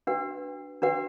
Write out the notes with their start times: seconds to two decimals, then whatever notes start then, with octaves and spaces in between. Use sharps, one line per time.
0.07 D4 F#4 B4 F#5
0.82 D4 F#4 B4 F#5